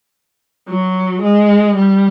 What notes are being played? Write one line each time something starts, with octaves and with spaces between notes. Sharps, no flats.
F#3
G#3
G3